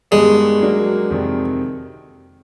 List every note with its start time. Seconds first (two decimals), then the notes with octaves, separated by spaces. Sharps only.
0.11 G2 D#3 G3 G#3 B3 D4
0.61 F#3 A#3 D4 F#4
1.10 F2 C3 D#3